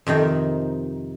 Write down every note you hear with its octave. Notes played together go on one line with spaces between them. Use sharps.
F2 C3 D#3 D#4